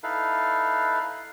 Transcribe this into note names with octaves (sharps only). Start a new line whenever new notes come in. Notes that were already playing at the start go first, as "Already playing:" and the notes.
D#4 E4 A4 B4 F5